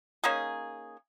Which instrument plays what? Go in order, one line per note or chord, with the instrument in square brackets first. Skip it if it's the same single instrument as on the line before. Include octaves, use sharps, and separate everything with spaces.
[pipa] A#3 C#4 D#4 G#4